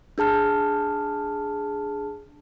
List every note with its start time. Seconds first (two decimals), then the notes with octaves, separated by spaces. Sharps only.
0.18 D4 G#4 A5 F6